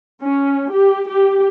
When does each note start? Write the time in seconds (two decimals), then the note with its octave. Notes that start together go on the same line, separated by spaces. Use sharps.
0.22 C#4
0.72 G4
1.08 G4